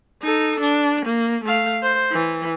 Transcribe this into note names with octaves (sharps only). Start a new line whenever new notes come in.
D#4 A4
D4
A#3
A3 F5
C5
E3